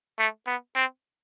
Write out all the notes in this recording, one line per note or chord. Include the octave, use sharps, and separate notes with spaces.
A3
B3
C4